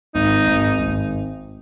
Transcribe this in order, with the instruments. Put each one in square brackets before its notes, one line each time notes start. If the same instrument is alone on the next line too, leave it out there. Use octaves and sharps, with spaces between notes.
[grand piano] G#1 [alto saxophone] D#4
[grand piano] G#1
G#1